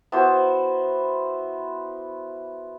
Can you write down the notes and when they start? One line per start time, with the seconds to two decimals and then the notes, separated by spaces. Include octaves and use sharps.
0.12 B3 E4 F#4 C5